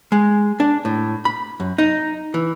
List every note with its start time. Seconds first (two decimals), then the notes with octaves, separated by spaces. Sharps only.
0.12 G#3
0.60 D4
0.85 A2
1.25 B5
1.60 F#2
1.78 D#4
2.34 E3